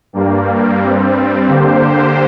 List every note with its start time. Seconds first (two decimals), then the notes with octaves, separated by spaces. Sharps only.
0.13 G2 G3 A#3
0.80 G2 G3 C4
1.48 D3 A#3 G4 C5